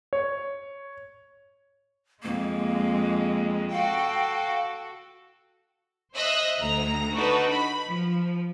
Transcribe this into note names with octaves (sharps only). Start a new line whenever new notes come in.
C#5
F2 G#3 A#3
F#4 A4 F5 G5
C5 D#5 E5 E6 F#6
D2 A#5
D4 D#4 F#4 A4 B4
B5
F3